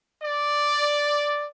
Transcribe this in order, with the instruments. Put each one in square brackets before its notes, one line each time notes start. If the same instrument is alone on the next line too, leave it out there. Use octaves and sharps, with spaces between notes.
[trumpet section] D5